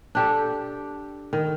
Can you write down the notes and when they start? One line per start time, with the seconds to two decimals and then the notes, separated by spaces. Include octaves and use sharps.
0.15 D4 G4 A4
1.33 D#3